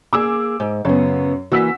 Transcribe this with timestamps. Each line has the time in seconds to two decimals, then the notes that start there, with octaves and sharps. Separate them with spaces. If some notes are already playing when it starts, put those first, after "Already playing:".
0.13 A#3 G#4 D6 E6
0.60 G#2
0.85 F#2 C#3 B3 C#5
1.52 E3 A#3 F#4 E6 B6